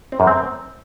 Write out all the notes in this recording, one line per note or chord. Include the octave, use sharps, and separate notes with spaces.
C4
F#2
C4